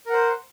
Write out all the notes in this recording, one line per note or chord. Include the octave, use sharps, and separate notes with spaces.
A#4 C5 F#5